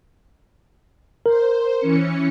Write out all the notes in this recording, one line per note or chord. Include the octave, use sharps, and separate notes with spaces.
A#4 C5
E3 C#4 C#7